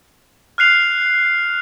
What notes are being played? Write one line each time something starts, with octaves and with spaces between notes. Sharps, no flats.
F6 F#6 C7 F7